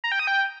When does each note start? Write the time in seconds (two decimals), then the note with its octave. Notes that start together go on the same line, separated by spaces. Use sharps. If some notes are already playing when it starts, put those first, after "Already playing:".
0.04 A#5
0.12 G5
0.19 D#6
0.27 G5